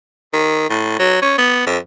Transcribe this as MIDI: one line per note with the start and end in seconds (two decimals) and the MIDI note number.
0.33 0.69 51
0.70 0.96 45
0.99 1.20 54
1.22 1.36 61
1.38 1.63 59
1.67 1.78 41